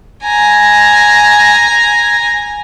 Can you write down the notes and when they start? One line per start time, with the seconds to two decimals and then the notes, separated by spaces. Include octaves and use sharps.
0.24 G#5 A#5